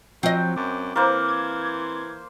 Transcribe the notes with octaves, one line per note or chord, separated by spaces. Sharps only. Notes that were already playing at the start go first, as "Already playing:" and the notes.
F3 F#3 C4 D#5
F#2 D6
E3 A#3 C5
G#6